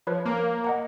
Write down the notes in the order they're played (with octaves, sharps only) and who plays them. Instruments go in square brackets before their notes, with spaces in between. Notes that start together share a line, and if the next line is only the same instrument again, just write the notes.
[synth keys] F3 [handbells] B4 C#5 B5
[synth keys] A#3
[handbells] D#5 F#5 A#5